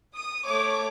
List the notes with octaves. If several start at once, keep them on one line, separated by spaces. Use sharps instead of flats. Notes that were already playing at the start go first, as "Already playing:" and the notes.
D#6
A3 C#5 D6